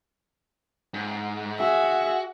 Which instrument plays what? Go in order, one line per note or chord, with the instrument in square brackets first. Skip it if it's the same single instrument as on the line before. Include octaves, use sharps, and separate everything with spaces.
[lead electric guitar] G#2
[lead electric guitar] F#4 [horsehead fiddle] G#4 E5